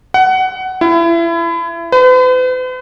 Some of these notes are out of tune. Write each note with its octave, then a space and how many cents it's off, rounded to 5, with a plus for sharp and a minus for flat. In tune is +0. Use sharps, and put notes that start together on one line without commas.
F#5 +20
E4 +30
B4 +45